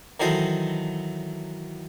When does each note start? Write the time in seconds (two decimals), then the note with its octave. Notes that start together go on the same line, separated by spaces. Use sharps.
0.20 D#3 E3 F#3 A4 C5 D#5